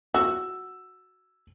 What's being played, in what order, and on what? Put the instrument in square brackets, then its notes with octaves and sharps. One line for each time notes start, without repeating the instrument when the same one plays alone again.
[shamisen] F#4 [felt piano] E6